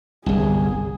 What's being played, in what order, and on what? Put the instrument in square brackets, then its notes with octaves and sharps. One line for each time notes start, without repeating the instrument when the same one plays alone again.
[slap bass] G1 C2 [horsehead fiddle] G#4